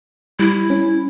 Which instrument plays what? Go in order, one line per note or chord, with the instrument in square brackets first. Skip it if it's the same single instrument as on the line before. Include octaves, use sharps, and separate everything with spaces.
[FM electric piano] G3 [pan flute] E4
[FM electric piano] C#4